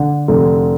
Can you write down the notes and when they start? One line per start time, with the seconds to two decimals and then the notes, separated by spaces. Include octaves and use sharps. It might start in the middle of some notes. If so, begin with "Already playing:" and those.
Already playing: D3
0.28 F1